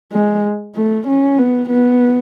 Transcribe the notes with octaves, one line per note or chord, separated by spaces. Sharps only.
G#3
A3
C#4
B3
B3